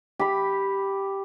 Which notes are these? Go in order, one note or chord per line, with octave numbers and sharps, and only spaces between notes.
G4 B5